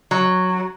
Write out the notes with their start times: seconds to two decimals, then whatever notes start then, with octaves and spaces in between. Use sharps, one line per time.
0.11 F#3